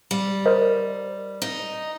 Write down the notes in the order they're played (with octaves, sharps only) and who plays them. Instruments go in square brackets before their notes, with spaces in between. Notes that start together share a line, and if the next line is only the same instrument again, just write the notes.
[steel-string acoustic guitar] G3
[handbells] A#4 C5 D#5
[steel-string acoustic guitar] D#4